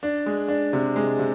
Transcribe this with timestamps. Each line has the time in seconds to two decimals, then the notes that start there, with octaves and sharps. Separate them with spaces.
0.03 D4
0.26 G#3
0.48 D4
0.73 C3
0.96 G#3
1.19 C3